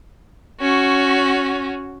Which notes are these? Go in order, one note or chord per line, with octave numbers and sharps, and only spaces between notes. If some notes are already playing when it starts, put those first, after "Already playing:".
C#4 F#4